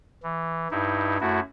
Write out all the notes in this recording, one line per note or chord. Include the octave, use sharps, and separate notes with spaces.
E3
G2 D#4 E4
F#2 A3 E4 F#4